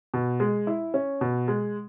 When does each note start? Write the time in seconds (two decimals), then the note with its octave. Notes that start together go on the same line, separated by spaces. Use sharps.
0.14 B2
0.40 G#3
0.67 E4
0.94 C#4
1.21 B2
1.48 G#3